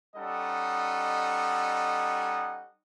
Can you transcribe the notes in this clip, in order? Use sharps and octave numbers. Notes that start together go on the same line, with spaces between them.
G3 C#4 D#4 A4 D#5 F#5